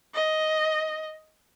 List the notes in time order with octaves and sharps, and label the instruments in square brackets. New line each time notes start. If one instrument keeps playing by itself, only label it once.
[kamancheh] D#5